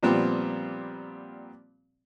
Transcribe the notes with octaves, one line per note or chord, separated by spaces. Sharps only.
A#2 F3 G3 B3 C4